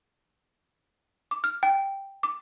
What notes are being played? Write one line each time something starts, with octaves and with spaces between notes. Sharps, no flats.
D6
F6
G5
D6